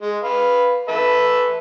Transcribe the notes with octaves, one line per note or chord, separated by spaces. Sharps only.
G#3
B4 F5
A4 B4 E5